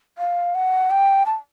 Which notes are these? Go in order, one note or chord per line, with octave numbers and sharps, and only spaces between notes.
F5
F#5
G5
A5